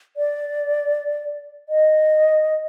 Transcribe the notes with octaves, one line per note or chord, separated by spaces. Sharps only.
D5
D#5